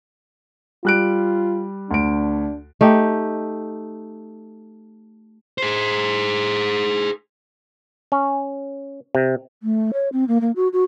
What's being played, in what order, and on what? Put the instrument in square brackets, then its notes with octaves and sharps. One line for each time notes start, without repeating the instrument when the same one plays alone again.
[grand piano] G3 F#6 D7 [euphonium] F4
[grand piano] D2 D7 [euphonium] D4
[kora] A3 D#4 G4
[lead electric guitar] G#4 C5
[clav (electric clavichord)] C#4
C3
[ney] A3
C#5
C4
A#3
A#3
F#4
F#4